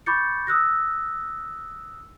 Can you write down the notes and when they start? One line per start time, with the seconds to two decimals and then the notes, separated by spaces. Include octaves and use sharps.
0.06 B5 C#6 D6 G6 A6 C#7
0.47 D#6 E6 F#6 A#6